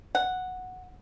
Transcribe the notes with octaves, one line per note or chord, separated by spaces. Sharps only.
F#5